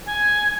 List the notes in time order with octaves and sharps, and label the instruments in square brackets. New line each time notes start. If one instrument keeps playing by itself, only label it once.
[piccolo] G#5